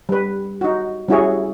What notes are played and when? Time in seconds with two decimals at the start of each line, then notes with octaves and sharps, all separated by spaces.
0.09 G3 B4
0.61 D#4 F#4
1.08 G3 C#4 E4 F#4 G#4 C#5